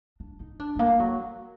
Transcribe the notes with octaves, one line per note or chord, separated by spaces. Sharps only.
D4
D#4
D4
G#3
A#3
F#3